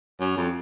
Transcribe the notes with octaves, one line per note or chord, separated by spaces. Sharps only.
F#2
F2